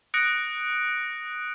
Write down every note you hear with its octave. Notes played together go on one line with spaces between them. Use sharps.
D#6 F#6 A#6 C#7 D7